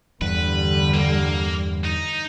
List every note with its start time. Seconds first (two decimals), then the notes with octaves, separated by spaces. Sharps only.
0.21 E2 G2 D3 G3 B4
0.94 A#3
1.84 D#4